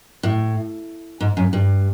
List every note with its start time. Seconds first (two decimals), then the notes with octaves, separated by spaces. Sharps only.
0.23 A2
1.20 G#2
1.37 F#2
1.53 G2